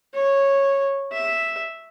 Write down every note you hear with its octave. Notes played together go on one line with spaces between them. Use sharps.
C#5
E5